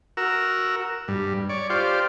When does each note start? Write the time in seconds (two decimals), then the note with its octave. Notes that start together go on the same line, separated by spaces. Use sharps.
0.17 F#4 A#4 E6
1.08 G2
1.49 C#5 D5
1.70 F4 G4 C5 D5